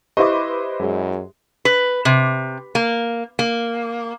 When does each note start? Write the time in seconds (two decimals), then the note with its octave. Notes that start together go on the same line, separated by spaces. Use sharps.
0.17 E4 G4 B4 C5 D#5 E5 C6 D6
0.80 F#2 G#3
1.65 B4
2.05 C3
2.75 A#3
3.39 A#3